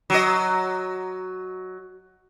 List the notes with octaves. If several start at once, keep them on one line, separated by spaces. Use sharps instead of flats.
F#3 D#5